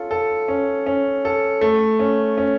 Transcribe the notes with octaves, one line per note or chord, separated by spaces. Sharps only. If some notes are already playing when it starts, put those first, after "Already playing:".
Already playing: C#4 F4 A4
A4
C#4
C#4
A4
A3
C#4
C#4